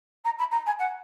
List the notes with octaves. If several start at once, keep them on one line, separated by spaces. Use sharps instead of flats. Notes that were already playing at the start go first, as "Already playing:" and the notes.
A#5
B5
A#5
G#5
F#5